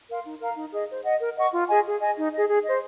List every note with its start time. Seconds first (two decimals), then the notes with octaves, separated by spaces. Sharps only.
0.09 A#4 F5 C6
0.25 D#4
0.40 A#4 F5 A#5
0.57 D#4
0.73 G#4 D#5
0.89 C5
1.04 D#5 F#5
1.20 A#4
1.36 D#5 F#5 C#6
1.52 F4
1.68 G#4 D#5 G#5
1.84 G#4
2.01 D#5 G#5
2.16 D#4
2.32 G#4 D#5
2.48 G#4
2.64 C5 D#5